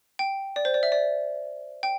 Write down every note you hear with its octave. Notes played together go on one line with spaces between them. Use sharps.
G5
D5
C5
D5
E5
D5
G5